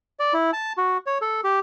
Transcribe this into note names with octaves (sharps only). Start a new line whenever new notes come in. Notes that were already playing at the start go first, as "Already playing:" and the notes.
D5
E4
A5
F#4
C#5
A4
G4